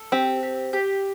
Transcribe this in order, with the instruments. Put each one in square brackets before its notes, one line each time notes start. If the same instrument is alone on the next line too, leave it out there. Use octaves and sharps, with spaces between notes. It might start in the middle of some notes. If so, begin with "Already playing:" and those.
Already playing: [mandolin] A4
[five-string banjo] C4 [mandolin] G4
[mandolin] G4
G4